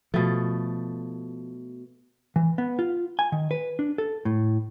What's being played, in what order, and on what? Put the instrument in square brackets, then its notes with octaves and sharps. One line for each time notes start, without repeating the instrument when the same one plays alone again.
[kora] B2 A3 [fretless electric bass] F3
[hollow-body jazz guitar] E3
B3
F4
G#5
D#3
B4
D4
A4
A2